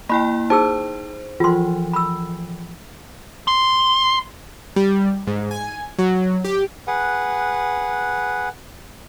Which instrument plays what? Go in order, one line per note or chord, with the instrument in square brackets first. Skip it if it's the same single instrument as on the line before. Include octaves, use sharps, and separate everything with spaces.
[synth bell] A#3 E4 G5 [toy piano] B5
[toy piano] D#4 G#4 E6 [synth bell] C5
[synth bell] E3 F3 [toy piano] F4 C6
[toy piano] B5 E6
[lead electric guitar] C6
[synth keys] G3
G#2
G#5
F#3
G4
[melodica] G#4 B4 F#5